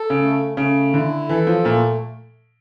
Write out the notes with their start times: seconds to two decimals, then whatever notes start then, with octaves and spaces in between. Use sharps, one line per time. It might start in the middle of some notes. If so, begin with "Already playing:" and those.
Already playing: A4
0.10 C#3
0.21 A3
0.57 C#3 A3
0.93 D3 E4
1.29 E3 A4
1.47 F3
1.65 A#2 A3